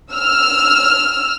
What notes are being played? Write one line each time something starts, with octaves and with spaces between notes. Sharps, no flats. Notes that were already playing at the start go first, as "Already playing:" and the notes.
E6 F6